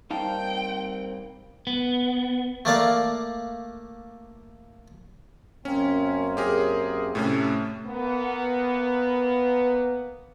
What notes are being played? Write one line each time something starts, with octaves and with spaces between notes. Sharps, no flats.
G3 A#3 C4 D#4 F5 G5 A5
B3
A3 A#3 D5 F5
F#2 A#3 C4 C#4 C#5
G4 G#4 A#4
A2 C3 A3 C#4
A#3 B3